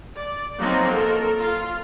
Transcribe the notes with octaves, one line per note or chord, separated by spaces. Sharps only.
D5
F3 F#3 A#3 C4 D#4
A4 A#4
F4 F5